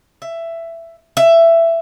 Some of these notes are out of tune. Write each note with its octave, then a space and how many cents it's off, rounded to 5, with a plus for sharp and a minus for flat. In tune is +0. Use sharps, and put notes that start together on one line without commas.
E5 +15
E5 +15